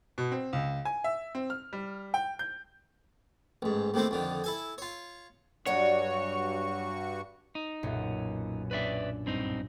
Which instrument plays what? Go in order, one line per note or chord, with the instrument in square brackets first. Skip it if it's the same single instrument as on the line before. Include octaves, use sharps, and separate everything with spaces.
[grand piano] B2
C4
C#2
G#5
E5
C4
F6
G3
G5
G6
[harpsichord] A1 G#2
D#2 A2 C3 A3 C4
F2 D3 D#3
E4 A4 G#5
F4 C#5
[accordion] G2 F#4 C#6 [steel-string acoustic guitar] F#3 D5 F#5 [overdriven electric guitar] C#5
[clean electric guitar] D#4
[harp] B1 F#2 A#2
[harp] D4 [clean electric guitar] B4 D5 E5
[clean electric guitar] G2 C4 D#4